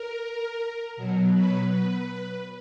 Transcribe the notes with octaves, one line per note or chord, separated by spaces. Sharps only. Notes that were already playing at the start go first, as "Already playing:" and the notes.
Already playing: A#4
B2 F#3
B4
B4